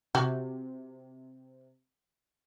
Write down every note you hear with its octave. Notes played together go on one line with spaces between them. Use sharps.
C3 F#4 G4